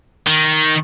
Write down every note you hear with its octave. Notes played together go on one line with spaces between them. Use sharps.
D#3